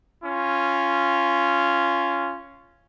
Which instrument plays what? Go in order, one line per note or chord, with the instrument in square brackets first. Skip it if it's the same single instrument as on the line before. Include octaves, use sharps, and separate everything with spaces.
[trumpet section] C#4 F4